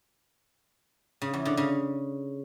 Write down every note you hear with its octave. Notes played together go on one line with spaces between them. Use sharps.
C#3
E2
D3
C#3